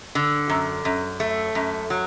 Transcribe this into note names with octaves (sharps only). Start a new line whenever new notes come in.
D3
F#2
F#2
A3
F#2
F#3